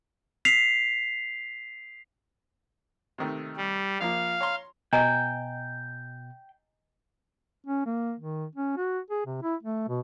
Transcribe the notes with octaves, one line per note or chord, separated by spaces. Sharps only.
B6 C7 F7
C3 D#3 A3
G3
A#1 F3 A#3 F5
C#5 A#5 C6
B2 D#5 G5 G#5 A#5
C#4
A#3
D#3
C#4
F#4
G#4
C3
E4
A3
B2